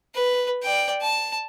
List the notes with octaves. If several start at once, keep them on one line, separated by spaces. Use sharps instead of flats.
B4
D5 G5
A5